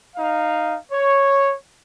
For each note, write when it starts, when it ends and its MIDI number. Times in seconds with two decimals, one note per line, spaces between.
0.16 0.75 63
0.16 0.75 77
0.90 1.53 73